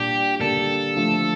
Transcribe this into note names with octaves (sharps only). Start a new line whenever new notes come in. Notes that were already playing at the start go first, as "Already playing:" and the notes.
Already playing: A#2 G3 D4 G4
D3 G3 A#3 D4 A4
D3 F3 A3